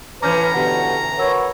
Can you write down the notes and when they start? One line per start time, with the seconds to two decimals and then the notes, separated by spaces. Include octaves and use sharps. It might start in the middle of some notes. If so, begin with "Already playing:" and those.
0.23 A2 E3 C#4 B4 A#5 D6 F6 G6
0.54 B2 D3 G4 B4 F#5
1.18 F#4 A#4 B4 C#5 E6